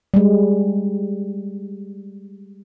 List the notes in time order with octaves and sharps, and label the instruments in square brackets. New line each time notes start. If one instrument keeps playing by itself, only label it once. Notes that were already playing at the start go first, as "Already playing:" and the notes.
[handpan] G3 G#3